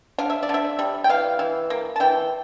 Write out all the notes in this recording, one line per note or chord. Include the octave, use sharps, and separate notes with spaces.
D3 F5
E5
D5
D3 E5
G3
G5
E3 F5
E3
A#3
A5
E3 G5